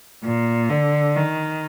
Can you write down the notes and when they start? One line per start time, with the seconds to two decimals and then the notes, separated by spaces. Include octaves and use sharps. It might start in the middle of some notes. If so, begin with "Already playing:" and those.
0.24 A#2
0.70 D3
1.16 D#3